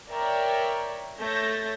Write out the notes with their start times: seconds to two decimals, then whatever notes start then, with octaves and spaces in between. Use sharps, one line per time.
0.12 A#4 C#5 D5 E5 G5
1.19 A3 C#5 E5 G6 A6 A#6